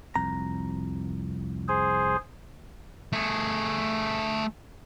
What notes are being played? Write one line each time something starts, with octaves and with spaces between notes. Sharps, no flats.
C2 F2 A#5
G#4 C5
A3 G#4